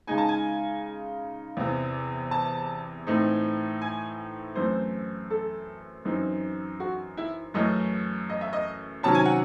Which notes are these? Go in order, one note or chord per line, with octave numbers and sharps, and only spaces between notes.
C#3 G#3 D#4 G#5
A5
G#5
E2 C3 E3
A5
A2 E3 A3 C4 D#4
G#5
F#2 E3 A3 C4 C5
A4
F#2 E3 C4 D#4
F#4
E4
F#2 E3 A3 C#4 D#5
D#5
E5
D#5
C3 D#3 F#3 C#4 A5
G#5
F#5